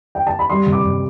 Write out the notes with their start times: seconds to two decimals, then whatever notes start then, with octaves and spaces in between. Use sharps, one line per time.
0.15 G5
0.27 A5
0.39 B5
0.50 G3 C6
0.66 C3
0.72 D6
0.85 C3